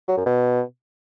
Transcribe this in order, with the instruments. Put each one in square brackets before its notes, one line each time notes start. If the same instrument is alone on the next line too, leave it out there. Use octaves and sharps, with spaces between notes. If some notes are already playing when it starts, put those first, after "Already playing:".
[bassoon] F#3
F#2
B2